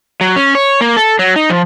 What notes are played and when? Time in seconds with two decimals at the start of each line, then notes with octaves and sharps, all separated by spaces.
0.21 F#3
0.36 C#4
0.55 C#5
0.81 A#3
0.96 A4
1.19 F#3
1.36 D#4
1.50 F3